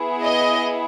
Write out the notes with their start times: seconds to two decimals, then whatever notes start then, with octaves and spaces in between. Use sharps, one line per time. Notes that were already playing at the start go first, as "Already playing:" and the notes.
Already playing: B3 E4 G#4
0.22 D#5